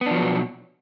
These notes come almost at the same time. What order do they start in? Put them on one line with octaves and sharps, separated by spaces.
B3 D4 F3 F#3 B2